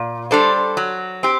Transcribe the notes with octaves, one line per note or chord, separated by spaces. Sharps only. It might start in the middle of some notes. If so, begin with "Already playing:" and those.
Already playing: A#2
G3 D4 A4 C5
F#3
C4 G4